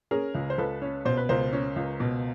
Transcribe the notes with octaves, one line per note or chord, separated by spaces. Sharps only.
C#4 G#4 A#4
C#2
C5
C#2 A4 B4
C#4
B2 C5
B4
C#2 A#4 C5
C#4
C#2
B2